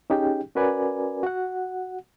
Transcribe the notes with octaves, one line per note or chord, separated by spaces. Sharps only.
C#4 D#4 G4 G#4 G5
C#4 F#4 A#4 B4 D5 G#5
F#4 F#5